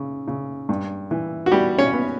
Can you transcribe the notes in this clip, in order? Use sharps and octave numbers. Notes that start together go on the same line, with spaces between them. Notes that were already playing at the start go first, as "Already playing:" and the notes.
Already playing: C#3
C#3
G2
E3
F#4
G3 B3 G4
C#4 C#5
B3